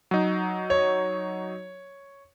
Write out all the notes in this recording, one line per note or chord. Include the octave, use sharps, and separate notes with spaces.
F#3 D#4
C#5